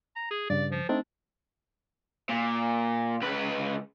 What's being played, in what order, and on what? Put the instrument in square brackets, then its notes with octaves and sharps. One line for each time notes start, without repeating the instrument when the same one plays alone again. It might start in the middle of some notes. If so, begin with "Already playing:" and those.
[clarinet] A#5
G#4
[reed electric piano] G2 C#3 [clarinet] D5
[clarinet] F3
[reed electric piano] A3 C4 D#4 [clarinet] D4
[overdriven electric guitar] A#2
C#2 B4